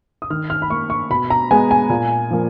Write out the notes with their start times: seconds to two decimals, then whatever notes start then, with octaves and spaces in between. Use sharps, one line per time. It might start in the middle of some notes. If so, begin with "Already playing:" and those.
0.22 D#6
0.30 D#3 F6
0.50 F6
0.62 B5
0.70 A#3 C#6
0.90 C#6
1.10 B2 B5
1.30 A#5
1.51 G#3 B3 G#5
1.71 G#5
1.90 A#2
2.31 F3 A#3